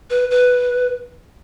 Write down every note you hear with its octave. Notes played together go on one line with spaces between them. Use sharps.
B4
B4